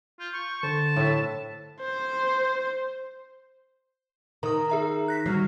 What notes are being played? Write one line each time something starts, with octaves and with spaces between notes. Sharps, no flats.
F4 G6
C#6
D3 C5 A5
A2 A4 E5
C5
D#3 A#5 D#6
G#4 E5 A#5
F#6 A#6 B6
D#3 F#3 G3 F6 C7